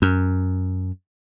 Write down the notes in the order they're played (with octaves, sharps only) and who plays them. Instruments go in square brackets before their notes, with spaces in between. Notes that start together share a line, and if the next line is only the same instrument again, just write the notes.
[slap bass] F#2